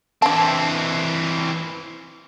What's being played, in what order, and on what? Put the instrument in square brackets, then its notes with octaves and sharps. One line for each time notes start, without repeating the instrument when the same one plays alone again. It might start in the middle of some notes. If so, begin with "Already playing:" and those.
[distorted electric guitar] E3 C4 [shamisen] D4 A5